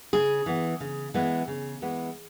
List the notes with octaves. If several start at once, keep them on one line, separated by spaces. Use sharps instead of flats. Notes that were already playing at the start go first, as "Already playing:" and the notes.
C#3 G#4
E3 B3
C#3
E3 G#3 B3
C#3
E3 G#3 B3